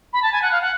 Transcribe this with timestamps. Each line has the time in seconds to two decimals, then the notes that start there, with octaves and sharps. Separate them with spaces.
0.13 B5
0.22 A5
0.32 G#5
0.42 F#5
0.51 F5
0.61 F#5